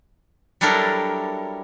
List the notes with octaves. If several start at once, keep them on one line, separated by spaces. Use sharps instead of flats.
F#3 G3 D4 E4 A4 A#4